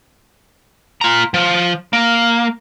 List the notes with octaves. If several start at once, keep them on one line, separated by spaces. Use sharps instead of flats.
F4 A#5
F3
A#3